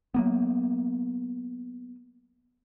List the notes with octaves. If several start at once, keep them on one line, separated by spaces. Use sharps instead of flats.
F#3 A#3 B3